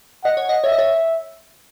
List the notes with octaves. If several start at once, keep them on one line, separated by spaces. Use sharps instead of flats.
D#5 F#5
C#5
D#5
C#5 E5
D#5
C#5